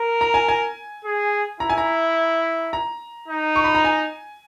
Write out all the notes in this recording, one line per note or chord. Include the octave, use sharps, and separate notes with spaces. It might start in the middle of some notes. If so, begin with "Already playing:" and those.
Already playing: A#4
A#5
G#5
G#5
G#4
E4 A#5
G#5
A#5
A#5
D#4
C#6
B5
A#5
G#5